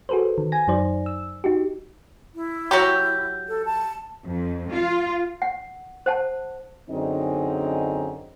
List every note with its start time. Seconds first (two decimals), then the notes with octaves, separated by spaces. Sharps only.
0.09 F#4 G#4 A4 B4 C5
0.38 D#3
0.52 G#5 A#6
0.68 F#2 F#3 D#4 C5 D5
1.06 E6
1.44 D#4 F#4 G4
2.35 E4
2.71 F#3 F#4 G4
3.48 A4
3.65 A5
4.25 F2
4.70 F4
5.42 F#5
6.06 C5 F#5 A5
6.90 F#2 D3 C4 D#4 G#4 D#5